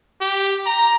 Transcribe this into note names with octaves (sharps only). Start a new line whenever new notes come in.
G4
A#5